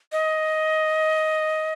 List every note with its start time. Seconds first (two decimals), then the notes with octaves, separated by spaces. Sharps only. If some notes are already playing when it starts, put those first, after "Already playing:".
0.12 D#5